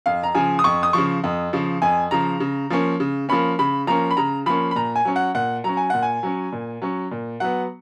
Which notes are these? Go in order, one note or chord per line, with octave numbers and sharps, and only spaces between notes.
F2 F5
A#5
C#3 F3 G#5
D#6
F2 C#6
D#6
C#3 F3 C#6
F2
C#3 F3
F2 G#5
C#3 F3 A#5
C#3
F3 A#3 C#4
C#3
F3 A#3 C#4 B5
C#3 B5
F3 A#3 C#4 A#5
B5
C#3 A#5
F3 A#3 C#4 B5
B5
A#2 A#5
G#5
F#3 C#4
F#5
A#2 F#5
F#3 C#4 A#5
G#5
A#2 F#5
G#5
F#3 C#4
A#2
F#3 C#4
A#2
F#3 B3 F#5